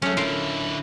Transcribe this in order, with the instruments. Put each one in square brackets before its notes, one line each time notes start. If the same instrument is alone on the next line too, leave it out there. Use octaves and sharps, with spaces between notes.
[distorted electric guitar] F#3 G#4 [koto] A3 C#4
[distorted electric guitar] D3 E4 [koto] F4 A4 A#4